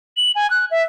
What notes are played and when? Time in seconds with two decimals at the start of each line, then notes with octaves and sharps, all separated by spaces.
0.17 F#7
0.35 G#5
0.50 F#6
0.71 E5